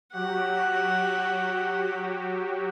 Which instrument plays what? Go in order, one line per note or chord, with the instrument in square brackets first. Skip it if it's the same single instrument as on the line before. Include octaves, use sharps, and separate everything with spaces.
[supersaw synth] F#3 F#4 G4 [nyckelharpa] F#5